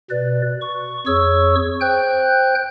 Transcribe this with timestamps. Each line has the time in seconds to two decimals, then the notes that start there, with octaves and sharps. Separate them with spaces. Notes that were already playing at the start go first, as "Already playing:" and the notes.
0.11 B2 B4 D5
0.61 C#6
1.07 F2 G#4 C#5 C#6 E6
1.81 C5 G5 F#6 G6